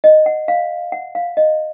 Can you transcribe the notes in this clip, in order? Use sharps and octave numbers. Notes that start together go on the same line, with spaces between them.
D#5
F#5
F5
F#5
F5
D#5